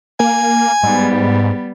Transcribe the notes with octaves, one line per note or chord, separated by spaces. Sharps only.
A#3 G#5
G#2 G3 B3